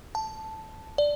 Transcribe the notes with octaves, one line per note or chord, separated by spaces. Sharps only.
A5
D5